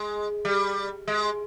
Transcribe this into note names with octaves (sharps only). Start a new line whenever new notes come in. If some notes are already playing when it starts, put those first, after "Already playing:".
Already playing: G#3
G3
G#3